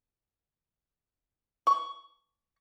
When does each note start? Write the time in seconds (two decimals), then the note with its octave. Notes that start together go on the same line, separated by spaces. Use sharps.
1.67 C#6